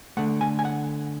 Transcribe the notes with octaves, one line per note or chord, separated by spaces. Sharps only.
D3 A3 F#5
G#5
G#5
F#5